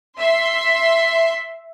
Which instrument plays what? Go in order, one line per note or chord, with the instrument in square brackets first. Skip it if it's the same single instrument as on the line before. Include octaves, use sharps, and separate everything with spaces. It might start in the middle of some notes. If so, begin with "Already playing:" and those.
[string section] E5 C6